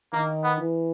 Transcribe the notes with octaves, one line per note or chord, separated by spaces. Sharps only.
D#3 A#3
B3
E3